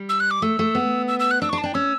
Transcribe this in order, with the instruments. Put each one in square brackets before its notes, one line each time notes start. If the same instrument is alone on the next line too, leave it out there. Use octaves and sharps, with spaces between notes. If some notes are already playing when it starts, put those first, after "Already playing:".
Already playing: [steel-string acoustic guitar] G3
[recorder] E6
F#6
D6
[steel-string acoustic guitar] A3 [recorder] E6
[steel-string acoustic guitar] A3
B3
[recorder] E6
E6
F#6
[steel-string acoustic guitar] D4 [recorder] E6
[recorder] C#6
[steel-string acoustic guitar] D4
[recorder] A5
[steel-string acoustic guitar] D4 [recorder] G5
[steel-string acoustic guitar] C#4 [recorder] E6